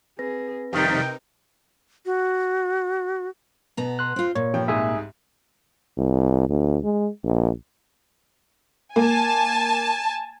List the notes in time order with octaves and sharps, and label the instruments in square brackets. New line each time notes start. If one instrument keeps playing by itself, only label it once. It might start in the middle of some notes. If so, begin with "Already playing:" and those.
[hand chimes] C4 B4 A#6 [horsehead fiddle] G#4
[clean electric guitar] F2 D#3 G3 [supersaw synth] C3 D#4 [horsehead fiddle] A#4 G5
[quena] F#4
[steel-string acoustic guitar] B2 B3 A#5
[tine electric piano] C6 F#6
[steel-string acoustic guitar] C4 F4
[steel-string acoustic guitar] A#2 [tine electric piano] C#5
[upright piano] G2 F3 G5
[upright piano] C2 G#2 [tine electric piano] E5 G#5 D#6
[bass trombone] C2
D2
G#3
A#1
[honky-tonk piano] A#3 [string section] G#5 A5